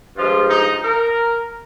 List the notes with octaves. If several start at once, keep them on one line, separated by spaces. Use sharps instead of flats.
G2 F3 G#3 F4
D#4
A#4